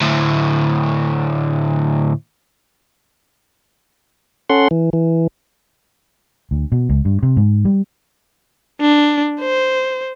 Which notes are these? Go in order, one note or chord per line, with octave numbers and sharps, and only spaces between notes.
D2 A2
C#4 A4 F#5 C6
E3
E3
D2
B2
C#2
G2
C3
G#2
G3
D4
C5